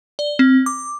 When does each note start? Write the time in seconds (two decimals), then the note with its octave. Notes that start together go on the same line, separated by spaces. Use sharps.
0.19 D5
0.39 C4
0.66 D6